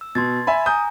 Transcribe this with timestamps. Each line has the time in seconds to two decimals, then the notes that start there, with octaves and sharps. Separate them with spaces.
0.01 E6
0.15 B2 C6 G#6 A6
0.47 E5 G#5 B5
0.66 G#5 A#5 D#6 G6